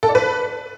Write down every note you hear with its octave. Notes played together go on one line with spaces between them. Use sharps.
A4
D5
B4